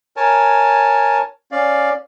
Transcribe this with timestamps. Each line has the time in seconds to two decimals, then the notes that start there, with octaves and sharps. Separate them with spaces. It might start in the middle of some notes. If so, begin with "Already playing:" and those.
0.17 A#4 C#5 G#5 A5
1.52 C#4 D5 F5